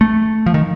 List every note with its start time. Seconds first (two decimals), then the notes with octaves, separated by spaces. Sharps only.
0.01 A3
0.46 F3
0.54 D#3